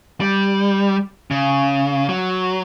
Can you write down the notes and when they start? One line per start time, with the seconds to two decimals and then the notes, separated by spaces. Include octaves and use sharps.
0.20 G3
1.31 C#3
2.09 F#3